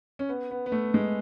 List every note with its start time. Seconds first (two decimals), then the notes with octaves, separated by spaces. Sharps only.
0.19 C#4
0.29 B3
0.51 B3
0.66 B3
0.72 A3
0.94 G#3